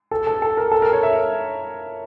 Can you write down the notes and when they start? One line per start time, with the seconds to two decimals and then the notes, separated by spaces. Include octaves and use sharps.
0.11 A4
0.27 A4
0.42 A4
0.57 A#4
0.72 A4
0.82 A#4
0.93 C#5
1.03 E5